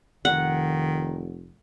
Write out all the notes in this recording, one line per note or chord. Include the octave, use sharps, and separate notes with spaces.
F1 D#3 F#5